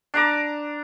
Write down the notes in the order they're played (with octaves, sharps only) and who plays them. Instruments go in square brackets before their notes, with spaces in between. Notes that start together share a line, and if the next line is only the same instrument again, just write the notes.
[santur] D4 A#5 D6